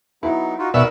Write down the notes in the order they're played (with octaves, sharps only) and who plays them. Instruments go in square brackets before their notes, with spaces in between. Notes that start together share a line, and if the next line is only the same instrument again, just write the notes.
[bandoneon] F#3 B3 D#4 [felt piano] E4
[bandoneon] D#4 F4 F#4
[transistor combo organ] B2 E5 [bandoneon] D#4 A#4 B5 [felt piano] D5